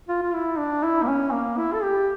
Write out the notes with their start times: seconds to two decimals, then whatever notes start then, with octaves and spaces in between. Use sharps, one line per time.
0.09 F4
0.22 F4
0.34 E4
0.58 D4
0.84 E4
1.03 A#3
1.08 C#4
1.32 A#3
1.58 E4
1.73 A4
1.83 G4